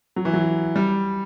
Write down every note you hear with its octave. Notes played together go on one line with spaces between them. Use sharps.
F#3
E3
F#3
G3